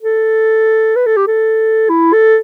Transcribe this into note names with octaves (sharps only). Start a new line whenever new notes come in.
A4
B4
A4
G4
A4
E4
A4